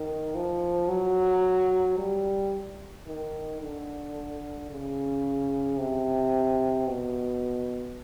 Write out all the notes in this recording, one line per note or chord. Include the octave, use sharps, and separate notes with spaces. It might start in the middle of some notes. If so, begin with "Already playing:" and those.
Already playing: D#3
F3
F#3
G3
D#3
D3
C#3
C3
B2